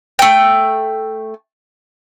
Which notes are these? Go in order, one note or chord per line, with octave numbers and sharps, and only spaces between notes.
A3 G5